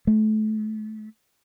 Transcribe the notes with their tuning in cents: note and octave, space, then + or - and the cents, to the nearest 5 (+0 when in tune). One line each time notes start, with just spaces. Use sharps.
A3 -30